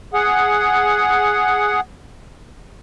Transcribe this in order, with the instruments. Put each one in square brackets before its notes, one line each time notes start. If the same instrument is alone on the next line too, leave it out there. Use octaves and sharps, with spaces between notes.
[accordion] G#4 F#5